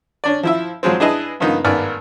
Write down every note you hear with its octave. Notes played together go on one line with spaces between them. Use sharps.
C#4 D4 D5
F3 E4 E5
F3 F#3 G#3 C4
D4 E4 G#4 B4 D#5 A5
G2 C#3 F3 A#3 B3 D#4
G#1 A#3 B3 D5 G#5 F6